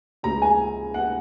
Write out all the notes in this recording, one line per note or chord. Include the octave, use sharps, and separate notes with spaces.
C#2 C#3 A#5
G#5
F#5